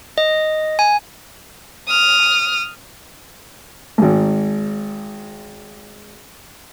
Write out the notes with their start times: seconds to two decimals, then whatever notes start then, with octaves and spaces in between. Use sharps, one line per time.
0.18 D#5
0.79 G#5
1.87 D#6 F6
3.98 G#1 G#2